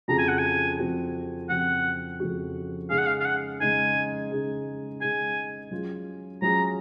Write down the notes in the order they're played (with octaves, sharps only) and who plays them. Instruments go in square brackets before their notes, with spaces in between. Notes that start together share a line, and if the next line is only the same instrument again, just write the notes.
[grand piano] F2 C#3 F3 C4 F#4 [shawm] A#5
[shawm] G#5
F#5
G#5
[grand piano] F2 C#3 F3 C4 F#4
[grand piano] F2 C#3 F3 C4 F#4 [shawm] F#5
[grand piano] F2 C#3 F3 C4 F#4
[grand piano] C#3 G#3 D#4 G#4 [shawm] F5
[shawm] F#5
F5
F5
F#5
[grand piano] C#3 G#3 D#4 G#4 [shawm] G#5
[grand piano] C#3 G#3 D#4 G#4
[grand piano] C#3 G#3 D#4 G#4 [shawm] G#5
[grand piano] F#3 C#4 F4 G#4
[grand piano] F#3 C#4 F4 G#4 [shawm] A#5